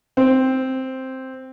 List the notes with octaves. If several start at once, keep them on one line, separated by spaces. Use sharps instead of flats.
C4